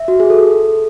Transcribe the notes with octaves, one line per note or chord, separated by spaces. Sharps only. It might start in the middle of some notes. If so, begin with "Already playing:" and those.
Already playing: E5
F#4
G#4
A4